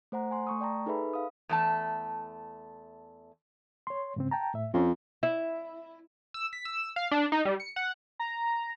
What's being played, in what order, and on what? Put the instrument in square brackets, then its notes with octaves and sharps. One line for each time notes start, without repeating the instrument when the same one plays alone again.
[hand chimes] A3 C5 F#5 A#5
G#5 C6
A3 C#6 D#6
D5 G5 A5 A#5
D#4 G#4 A4 B4 E5 B5
F5 D#6
[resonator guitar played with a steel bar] E2 A3 A5
[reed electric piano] C#5 C6
G#2 C#3 C4
G5 A5 A#5
A2 E5
[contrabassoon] F2 [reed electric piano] C4 C#4
[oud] E4
[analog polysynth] E6
B6
E6
F5
D4
D#4
G3
C#7
F#5
[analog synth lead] A#5